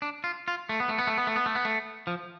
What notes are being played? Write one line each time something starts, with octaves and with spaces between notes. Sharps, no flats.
D4
F4
F4
A3
B3
A3
B3
A3
B3
A3
B3
A3
B3
A3
F3